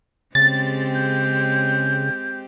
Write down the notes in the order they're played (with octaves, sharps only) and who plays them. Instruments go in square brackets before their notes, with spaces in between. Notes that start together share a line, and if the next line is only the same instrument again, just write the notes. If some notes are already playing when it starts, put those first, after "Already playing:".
[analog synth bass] C#3 [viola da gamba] G#3 C4 G4 [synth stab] A6
[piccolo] G6